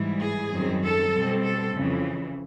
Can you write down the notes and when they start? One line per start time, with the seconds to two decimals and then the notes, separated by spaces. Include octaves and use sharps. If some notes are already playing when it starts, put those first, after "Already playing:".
Already playing: G#2 E3 G3
0.20 G#4
0.52 F#2 D#3 G3 C4
0.83 A4
1.13 B2 G3 C4
1.44 A4
1.75 F2 C#3 E3